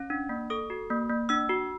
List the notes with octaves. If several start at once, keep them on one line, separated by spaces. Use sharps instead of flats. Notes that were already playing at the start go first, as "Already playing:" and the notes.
Already playing: C#4
D4
A#3
A4 D#6
F#4
A#3
A#3
D4 E6
F#4